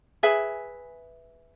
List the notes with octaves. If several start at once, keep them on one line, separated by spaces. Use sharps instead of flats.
G#4 B4 E5 G#5